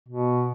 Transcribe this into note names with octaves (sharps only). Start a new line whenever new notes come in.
B2